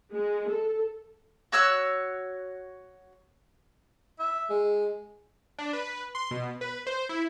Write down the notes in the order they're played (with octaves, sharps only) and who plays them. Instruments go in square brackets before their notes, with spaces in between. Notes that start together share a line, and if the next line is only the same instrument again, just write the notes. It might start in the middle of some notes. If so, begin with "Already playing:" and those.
[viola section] G#3
A4
[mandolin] F#4 C#5 E6 F#6
[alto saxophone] E5
G#3
[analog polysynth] D4
B4
C6
B2
B4
C5
E4